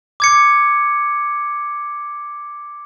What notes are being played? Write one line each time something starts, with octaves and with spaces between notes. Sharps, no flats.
D6 G#6 C#7